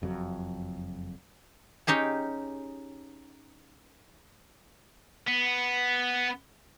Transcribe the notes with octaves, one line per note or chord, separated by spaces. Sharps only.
F#1 F2 G#2 F#3
C#4 D#4 G4 G#4
B3